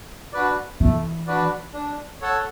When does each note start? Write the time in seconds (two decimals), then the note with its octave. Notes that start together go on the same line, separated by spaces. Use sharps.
0.33 D4 F#4 B4 D5
0.80 E3 A3
1.27 D4 F#4 B4 D5
1.74 D4
2.21 A4 C#5 F#5 A5